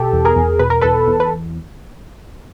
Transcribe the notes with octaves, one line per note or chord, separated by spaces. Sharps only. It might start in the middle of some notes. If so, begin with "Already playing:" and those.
Already playing: B2 G4 A4
E2
G#4 A#4
E2
B2 B4
A#4
E2 A4 B4
E2
B4